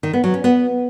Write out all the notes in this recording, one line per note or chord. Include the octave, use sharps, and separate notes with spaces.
D#3
B3
F#3
C#4
B3